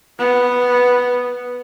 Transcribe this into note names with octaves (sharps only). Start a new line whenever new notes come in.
B3